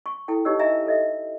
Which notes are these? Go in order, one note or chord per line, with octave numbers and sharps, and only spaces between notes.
C#6
E4 A4 G5
D#4 G4 B4 C#5 D#5 E6
D#4 D#5 E5 G#5 A#5
A4 D#5 E5